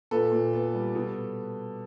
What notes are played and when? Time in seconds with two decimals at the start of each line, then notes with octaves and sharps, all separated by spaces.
0.11 A#2 A4 B4
0.32 A#2
0.53 B3
0.74 G3
0.95 B2